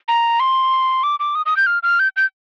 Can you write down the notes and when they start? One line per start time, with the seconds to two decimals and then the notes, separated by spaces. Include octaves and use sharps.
0.08 A#5
0.40 C6
1.03 D6
1.20 D6
1.35 D#6
1.46 D#6
1.57 G6
1.67 F6
1.83 F6
1.99 G6
2.17 G6